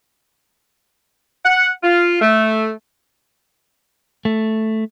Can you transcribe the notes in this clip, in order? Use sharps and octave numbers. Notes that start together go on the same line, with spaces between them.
F#5
F4
A3
A3